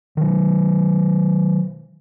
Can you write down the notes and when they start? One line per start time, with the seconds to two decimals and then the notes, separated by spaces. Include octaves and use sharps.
0.17 D#3 F#3